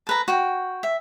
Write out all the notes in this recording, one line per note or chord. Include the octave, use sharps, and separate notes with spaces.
A4 B4 A#5
F#4 G5
E5